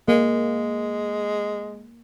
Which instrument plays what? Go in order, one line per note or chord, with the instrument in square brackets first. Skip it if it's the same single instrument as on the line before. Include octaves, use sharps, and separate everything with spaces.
[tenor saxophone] G#3 [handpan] A#3